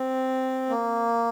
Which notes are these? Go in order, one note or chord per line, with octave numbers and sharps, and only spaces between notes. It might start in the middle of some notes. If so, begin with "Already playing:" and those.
Already playing: C4
A#3